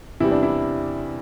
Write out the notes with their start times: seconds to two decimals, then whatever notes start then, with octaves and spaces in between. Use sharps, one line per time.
0.20 E2 C3 G3 E4
0.31 D4
0.43 E4